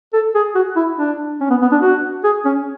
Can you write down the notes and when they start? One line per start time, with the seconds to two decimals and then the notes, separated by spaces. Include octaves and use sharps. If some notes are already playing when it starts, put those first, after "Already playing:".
0.13 A4
0.35 G#4
0.55 F#4
0.76 E4
0.98 D4
1.41 C#4
1.50 B3
1.62 B3
1.72 D4
1.82 F#4
2.24 G#4
2.45 C#4